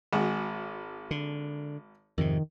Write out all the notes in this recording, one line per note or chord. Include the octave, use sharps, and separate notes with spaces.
G#1 G#3 F#4
D3
F2 G#2 C3 D#3